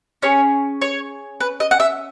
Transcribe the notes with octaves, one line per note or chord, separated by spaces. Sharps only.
C#4 G#4 C#5
C#5
B4
D#5
F#5
E5